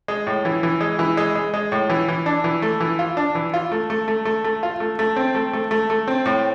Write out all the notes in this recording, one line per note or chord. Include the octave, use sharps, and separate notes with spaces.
G#3
A2
E3
E3
G#3
E3
G#3
G#3
G#3
A2
E3
E3
D4
E3
A3
E3
F4
D4
E3
F4
A3
A3
A3
A3
A3
F4
A3
A3
C4
A3
A3
A3
A3
C4
A2